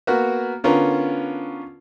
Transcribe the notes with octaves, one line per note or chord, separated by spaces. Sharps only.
A#3 B3 F#4
D3 B3 C#4 F4 A#4